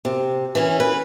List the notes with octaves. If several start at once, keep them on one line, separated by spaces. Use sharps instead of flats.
C3
E3 C#4
B4